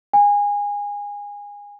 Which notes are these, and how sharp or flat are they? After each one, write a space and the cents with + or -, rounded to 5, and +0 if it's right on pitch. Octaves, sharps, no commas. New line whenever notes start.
G#5 -25